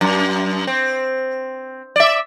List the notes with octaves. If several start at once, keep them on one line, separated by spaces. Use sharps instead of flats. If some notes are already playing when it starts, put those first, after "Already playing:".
F#2
C4
D5 E5